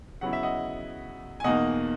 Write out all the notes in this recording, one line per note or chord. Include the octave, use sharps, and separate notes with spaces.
C#3 F#3 B3 E4 F#5
E5
D#5 F#5
G#5
E2 B2 A#3 D#4 D#5 F#5